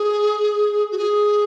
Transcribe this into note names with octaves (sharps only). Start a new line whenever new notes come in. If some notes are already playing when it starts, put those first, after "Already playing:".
Already playing: G#4
F#4
G#4